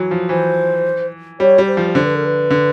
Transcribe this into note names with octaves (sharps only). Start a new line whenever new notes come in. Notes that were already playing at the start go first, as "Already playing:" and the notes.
Already playing: E3 F#3
F3
E3 C5
G3 C#5
G3
C5
F3
D3 C5
B4
A#4
B4
D3